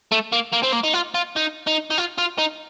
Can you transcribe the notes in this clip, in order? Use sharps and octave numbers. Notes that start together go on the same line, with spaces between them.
A3
A#3
A#3
C4
A#3
D#4
F4
F4
D#4
D#4
D#4
F4
F4
D#4